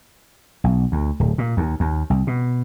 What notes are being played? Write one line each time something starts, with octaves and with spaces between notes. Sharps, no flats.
B1
D2
D1
A#2
D#2
D#2
C2
B2